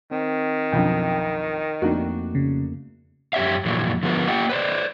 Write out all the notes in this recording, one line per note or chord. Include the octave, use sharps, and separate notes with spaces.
D#3 C4
B1 F2 D3 G5
F2 A3 A#3 D4 D#4 F#4
C#3
F#2 G4 C#5 E5 F5
F2 A#2 E3 F#3
D3 F3 B3 A#4 B4
A#3 G4 D#5 F#5 G5
B4 C5 D5